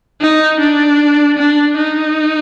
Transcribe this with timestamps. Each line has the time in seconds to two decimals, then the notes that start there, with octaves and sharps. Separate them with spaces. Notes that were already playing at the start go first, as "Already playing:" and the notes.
0.21 D#4
0.60 D4
1.38 D4
1.77 D#4